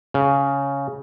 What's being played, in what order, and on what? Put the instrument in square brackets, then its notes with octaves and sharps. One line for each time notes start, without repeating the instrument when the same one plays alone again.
[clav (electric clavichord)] C#3